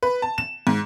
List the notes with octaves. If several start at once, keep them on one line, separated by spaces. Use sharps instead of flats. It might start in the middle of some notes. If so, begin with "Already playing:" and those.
B4
A5
E7
G#2